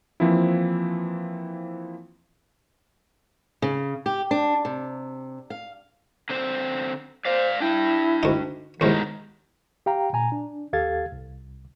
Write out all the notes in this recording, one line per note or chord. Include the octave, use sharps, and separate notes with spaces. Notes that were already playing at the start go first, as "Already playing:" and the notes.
E3 F3 A#3 C4 E4
C#3
G4
D4
C3
F5
D3 C4 C5
C5 D5 F5
D4 E4 G5
D2 D#4
D#2 G#2 B2 D#4 E4 A#4
G4 F5 G5 A#5
A#2 G#5 A#5
D4
D#2 G4 A4 F5 G#6 A6
C2